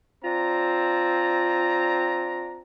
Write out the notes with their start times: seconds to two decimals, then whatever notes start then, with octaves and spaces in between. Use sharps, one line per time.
0.24 C4 D4 F4 A#5